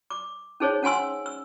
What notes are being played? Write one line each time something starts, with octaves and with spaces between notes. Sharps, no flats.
D6
C#4 D#4 G#4 C5 C#5
C#4 F#5 G#5 C6 E6
E6